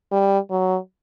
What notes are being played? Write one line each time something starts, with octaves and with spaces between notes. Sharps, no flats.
G3
F#3